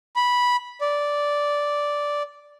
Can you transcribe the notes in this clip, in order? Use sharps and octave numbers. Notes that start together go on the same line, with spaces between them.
B5
D5